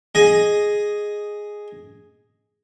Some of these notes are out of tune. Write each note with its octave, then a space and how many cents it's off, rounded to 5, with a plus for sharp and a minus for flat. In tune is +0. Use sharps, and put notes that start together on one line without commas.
G#4 +0 D#5 +0